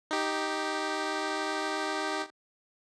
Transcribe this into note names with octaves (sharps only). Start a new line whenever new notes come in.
D#4 G4